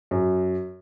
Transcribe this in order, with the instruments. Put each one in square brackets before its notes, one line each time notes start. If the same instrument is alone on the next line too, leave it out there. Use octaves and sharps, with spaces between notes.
[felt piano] F#2